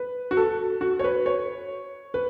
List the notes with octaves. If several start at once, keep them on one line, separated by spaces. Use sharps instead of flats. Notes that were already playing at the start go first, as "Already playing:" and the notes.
Already playing: B4
F#4
A4
F#4
C#5
B4
C#5
B4